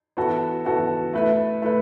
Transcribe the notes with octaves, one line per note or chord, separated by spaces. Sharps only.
E3 B3 F#4 A4
E3 B3 F#4 A4
A3 E4 B4
A3 E4 B4